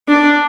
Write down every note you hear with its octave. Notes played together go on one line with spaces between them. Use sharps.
D4